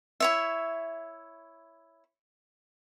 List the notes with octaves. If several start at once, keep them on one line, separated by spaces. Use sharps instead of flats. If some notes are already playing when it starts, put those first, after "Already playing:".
E4 C#5 E5